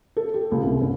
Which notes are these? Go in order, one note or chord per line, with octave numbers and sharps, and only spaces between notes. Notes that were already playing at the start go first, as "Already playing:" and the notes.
A4
G4
C#2
C2
G1